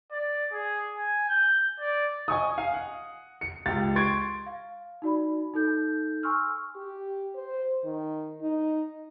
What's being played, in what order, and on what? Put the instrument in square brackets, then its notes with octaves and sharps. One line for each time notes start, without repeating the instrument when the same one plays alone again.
[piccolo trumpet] D5
G#4
G#5
G6
D5
[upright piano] D#5 G#5 C#6 D#6
F5 G#5
F#5
C#7
C#2 G4 A6
C6 C#6 G#6 A6 D7
[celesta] F5
D#4 F#4 D5 B5
D#4 A4 G6
G#5 C6 C#6 E6 F6
[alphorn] G4
C5
D#3
D#4